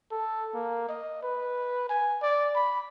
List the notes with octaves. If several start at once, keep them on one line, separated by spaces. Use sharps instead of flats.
A4
A#3
D#5
B4
G#5
D5
B5